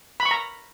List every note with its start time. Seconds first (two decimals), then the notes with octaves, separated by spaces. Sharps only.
0.20 B5
0.25 C#6
0.31 A#5